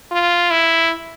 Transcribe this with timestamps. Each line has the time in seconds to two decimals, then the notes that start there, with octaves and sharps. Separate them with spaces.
0.11 F4
0.51 E4